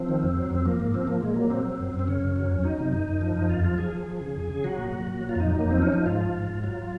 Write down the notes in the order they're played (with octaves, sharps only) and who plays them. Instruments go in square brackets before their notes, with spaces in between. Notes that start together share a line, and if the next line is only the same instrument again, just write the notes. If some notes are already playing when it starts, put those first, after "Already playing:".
Already playing: [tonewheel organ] F3 C4
D#3
F2
F#3
F2 C4
F3 A#3
G#2
F3 C4
F3 A#3
A#2 G#3
F#3 A#3
F#3 C4
F#3
F#2
F#2
C4
C#3 C#4
F#2
F#3
F2
F#3 D#4
C3
F#2
F#2
F3
F#2
F2 F4
F3 F4
F3 G#4
F3
F3
C#3
F2
C#3
F#3 F#4
A#2
A#2
A#2
F#3
F4
F2 D#4
F#3
F2 A#3
C4
F3 C#4
F3 D#4
G#2 F4
F3
G#2
G#2
F#3 F4